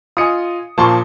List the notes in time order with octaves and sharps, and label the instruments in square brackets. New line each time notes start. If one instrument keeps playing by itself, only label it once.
[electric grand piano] F4 D#5 G#5 [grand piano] D#6 C#7
[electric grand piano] A#2 F3 A#3 [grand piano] A5 C6 C#6